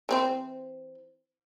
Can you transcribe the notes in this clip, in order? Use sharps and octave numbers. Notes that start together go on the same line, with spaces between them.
E3 C4 C5